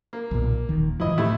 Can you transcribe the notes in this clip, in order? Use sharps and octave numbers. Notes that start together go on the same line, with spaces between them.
A#3
B1 A#2
D#1 D#3
G2 E3 F3 E4 D#5
A2 C3 A3 E4